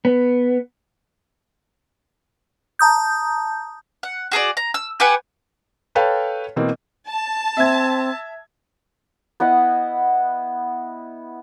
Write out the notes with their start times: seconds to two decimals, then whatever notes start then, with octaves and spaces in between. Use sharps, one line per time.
0.05 B3
2.79 A5 A#5 D#6 G6
4.03 F#5
4.32 F#4 G#4 A4 D5
4.57 A#5
4.74 E6
5.00 G4 B4 F#5 G#5
5.95 A4 B4 C#5 F5 G5 A5
6.56 B2 E3 A#3 C4
7.07 A5
7.57 C4 E5 G#6
9.40 B3 E4 D#5 F#5